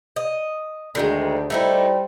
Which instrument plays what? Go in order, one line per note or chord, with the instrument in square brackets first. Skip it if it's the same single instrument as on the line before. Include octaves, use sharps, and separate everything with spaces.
[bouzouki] D#5
[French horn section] D2 [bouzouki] D3 D#3 G#3
[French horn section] G3 C5 [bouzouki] A3 D#4 E4